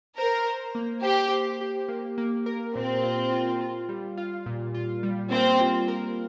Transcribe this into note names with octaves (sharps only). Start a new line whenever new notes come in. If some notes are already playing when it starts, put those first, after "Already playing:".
A#4 C5
C5
A#3
G4 C5
C5
G4
A#3
A#3
A#4
A#2 C4
F4
F4
F4
G3
F4
A#2
F4
G3
A#3 C4
F4
A#4